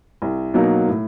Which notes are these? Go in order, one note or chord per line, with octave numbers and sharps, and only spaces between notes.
C2
B2 F#3 A#3 D#4
A2